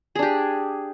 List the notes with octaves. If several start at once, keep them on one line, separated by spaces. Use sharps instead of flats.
D4 G4 G#4